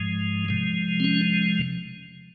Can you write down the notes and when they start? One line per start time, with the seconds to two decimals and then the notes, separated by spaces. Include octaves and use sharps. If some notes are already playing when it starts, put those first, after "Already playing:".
Already playing: G#2 F3 G#3
0.49 C3 F3 G#3
1.00 C4
1.04 C#4